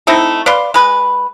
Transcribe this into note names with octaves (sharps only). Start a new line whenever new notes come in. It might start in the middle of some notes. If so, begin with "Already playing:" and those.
A3 C4 D#4 E4
B4 D5 F5 C6
G#3 B4